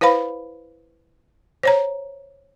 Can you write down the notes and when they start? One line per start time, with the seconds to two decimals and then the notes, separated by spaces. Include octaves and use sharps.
0.01 E4 B4 C5 F5 B5
1.63 C5 C#5 A#5